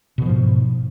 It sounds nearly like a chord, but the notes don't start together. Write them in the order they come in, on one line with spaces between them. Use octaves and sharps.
B2 D3 F3 G#2